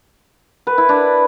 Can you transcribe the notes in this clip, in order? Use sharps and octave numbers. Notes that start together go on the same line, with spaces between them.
B4
E4
D4